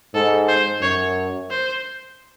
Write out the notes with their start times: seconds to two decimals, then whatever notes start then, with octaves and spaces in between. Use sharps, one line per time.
0.14 G#2 A4
0.48 C5
0.81 F#2 C#5
1.50 C5